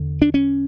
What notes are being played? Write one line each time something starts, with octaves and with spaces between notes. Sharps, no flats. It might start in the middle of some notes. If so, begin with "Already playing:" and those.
Already playing: E2 D3
D4
C#4